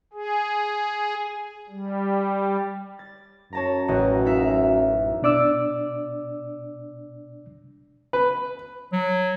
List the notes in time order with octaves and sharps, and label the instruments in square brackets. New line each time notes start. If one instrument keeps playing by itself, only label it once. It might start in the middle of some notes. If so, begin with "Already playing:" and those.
[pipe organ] G#4
G3
[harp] A6
[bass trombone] F#2 [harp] C#5 A5 A#5
[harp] A1 F#4 D#5
D#4 E5 F5
[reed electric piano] B2 D4 D5 D6 E6
[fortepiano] B4
[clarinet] F#3